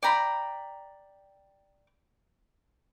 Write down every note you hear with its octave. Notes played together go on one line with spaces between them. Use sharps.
D5 G5 A#5 B5